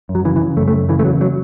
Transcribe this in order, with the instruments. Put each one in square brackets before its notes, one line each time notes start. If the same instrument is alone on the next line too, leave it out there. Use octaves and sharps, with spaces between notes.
[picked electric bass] F#2
F#3
C#3 E3
E3
C#3
F#2 A3
A3
F#2
C#3 E3
A3
E2 F#3
F#3